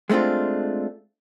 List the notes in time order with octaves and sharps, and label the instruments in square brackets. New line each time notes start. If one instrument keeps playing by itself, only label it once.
[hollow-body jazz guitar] G#3 A3 C4 D4 F4